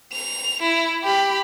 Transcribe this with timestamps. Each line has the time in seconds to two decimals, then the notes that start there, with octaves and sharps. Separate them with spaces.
0.13 F7
0.62 E4
1.03 G4 B5